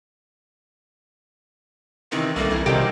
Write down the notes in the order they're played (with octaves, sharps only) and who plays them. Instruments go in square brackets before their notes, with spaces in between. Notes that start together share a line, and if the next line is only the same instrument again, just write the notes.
[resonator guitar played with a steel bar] C3 D#3 E3 [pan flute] C4
[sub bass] B1 [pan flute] G3 [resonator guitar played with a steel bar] A3 A#3
[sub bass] B1 [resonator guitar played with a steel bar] E3 E4 A#4
[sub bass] C3 [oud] D#3 D#4 G4 [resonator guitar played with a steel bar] F3 F#3 C4